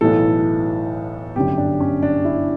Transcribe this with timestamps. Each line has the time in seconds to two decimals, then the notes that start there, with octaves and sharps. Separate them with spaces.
0.01 B1 A2 E3 A4
1.35 G1 F#2 D3 G4
1.58 D4
1.80 C#4
2.02 D4
2.25 E4